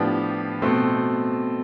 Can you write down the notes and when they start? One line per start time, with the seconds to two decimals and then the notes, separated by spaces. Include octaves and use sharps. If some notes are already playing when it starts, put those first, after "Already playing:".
Already playing: A2 F3 B3 D4 G4
0.62 B2 A3 C4